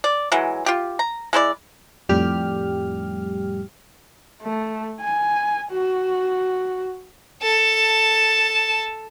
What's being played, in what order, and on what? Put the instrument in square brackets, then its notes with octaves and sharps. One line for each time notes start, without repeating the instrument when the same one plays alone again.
[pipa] D5
E3 F#3 G#3
F4 G4
A#5
G#3 E4 C5 D5
[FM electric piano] F2 A2 G3 G4 F6
[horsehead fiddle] A3
G#5
F#4
[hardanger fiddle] A4 A5